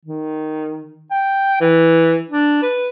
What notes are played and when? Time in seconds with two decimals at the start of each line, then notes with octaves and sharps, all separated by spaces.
0.05 D#3
1.11 G5
1.60 E3
2.29 D4
2.62 B4